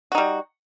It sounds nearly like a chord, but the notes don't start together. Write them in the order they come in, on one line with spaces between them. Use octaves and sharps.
F#4 D#4 G3